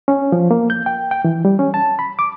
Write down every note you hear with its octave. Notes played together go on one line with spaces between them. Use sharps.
C#4
F3
A#3
G6
G5
G5
E3
G3
C#4
A5
B5
D6